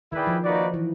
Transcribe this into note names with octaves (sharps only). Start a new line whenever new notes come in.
D#3 E4 G#4 B4 D5 G5
F3
A#3 D#4 F#4 B4 D5
E3